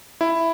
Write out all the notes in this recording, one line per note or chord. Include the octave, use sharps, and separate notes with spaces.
E4